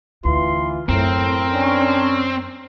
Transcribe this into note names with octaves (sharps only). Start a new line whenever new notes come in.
D2 E3 F4 C6
F#2 A2 C4 A#4
C#4 D4